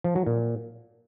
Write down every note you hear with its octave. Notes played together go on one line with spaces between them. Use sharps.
F3
F#3
A#2